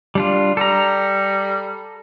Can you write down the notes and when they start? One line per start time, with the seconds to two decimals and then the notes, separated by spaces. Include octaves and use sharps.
0.15 G3 D4 F4
0.57 G3 A4 A#5